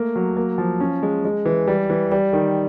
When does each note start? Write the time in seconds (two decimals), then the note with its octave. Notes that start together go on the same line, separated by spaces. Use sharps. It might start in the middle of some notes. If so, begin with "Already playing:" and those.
Already playing: A3 A#3
0.15 F#3
0.37 A#3
0.58 F3
0.80 C#4
1.03 G#3
1.25 G#3
1.45 E3
1.67 G3
1.90 E3
2.12 G3
2.33 D#3